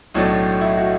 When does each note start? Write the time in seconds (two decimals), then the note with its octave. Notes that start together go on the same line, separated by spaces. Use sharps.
0.14 B1 A2 F#3 D4
0.61 E4
0.77 F#4